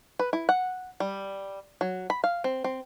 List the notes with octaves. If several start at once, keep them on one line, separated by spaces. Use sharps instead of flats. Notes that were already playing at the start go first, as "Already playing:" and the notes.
B4
E4
F#5
G3
F#3
B5
F5
C4
C4